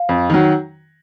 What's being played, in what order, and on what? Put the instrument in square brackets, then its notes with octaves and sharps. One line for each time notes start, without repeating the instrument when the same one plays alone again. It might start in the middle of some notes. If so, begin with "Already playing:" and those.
Already playing: [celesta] F5
[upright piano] F2
D#3 F#3